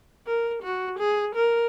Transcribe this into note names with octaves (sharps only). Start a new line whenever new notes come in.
A#4
F#4
G#4
A#4